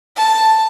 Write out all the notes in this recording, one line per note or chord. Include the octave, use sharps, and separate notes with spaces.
A5